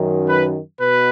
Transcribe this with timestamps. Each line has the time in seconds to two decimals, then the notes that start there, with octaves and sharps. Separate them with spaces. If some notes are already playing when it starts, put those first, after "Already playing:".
Already playing: F#2 D#3
0.28 B4
0.80 B2 B4